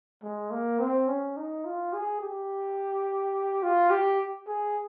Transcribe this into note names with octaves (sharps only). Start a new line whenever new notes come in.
G#3
A#3
C4
C#4
D#4
F4
G#4
G4
F4
G4
G#4